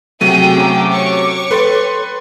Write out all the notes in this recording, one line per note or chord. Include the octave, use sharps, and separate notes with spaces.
C3 F#3 A3 G#4 G5 D#7
C#4 A#5 D6
C#5 C#6
A4 B4 G5 C6 A6